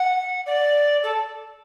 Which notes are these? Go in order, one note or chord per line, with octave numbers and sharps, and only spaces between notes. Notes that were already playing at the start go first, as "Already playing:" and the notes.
Already playing: F#5
D5
A4